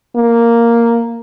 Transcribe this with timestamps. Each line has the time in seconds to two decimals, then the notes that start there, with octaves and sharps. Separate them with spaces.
0.16 A#3